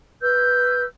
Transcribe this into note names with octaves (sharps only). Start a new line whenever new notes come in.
B4 E6 G6